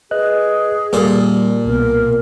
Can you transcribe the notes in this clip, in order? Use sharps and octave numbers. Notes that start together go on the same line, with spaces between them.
G#4 B4 D#5 F#6
A#2 G3 A4 D5
C2 B2 B3 A#4